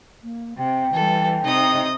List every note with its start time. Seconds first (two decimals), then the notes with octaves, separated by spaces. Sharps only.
0.23 A#3
0.58 C3 G5
0.94 E3 G3 A4
1.44 C3 D#4 D#5 D#6